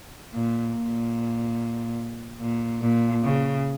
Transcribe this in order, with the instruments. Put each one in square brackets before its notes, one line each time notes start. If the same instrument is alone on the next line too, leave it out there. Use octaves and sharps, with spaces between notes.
[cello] A#2
A#2
A#2
A#2
C#3